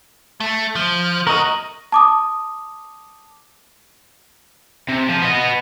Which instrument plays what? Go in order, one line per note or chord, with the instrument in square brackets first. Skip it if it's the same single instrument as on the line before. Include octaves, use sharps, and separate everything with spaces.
[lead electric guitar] A3
F3
[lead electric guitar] A3 F#4 [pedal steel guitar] A#4 D#5
[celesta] A5 D6 D#6
[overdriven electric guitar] C3
F3
B3 D#5